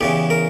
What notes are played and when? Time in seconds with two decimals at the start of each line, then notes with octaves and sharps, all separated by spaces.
0.01 E2 C#3 E3 G4
0.30 A#4